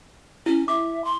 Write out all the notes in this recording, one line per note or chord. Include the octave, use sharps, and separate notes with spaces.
C#4 E4
E5 D6
C6